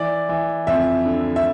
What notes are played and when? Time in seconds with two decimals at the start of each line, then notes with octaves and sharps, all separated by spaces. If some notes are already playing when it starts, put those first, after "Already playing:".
Already playing: E3 D5
0.29 E3
0.67 F2 E5
1.06 D3
1.36 E5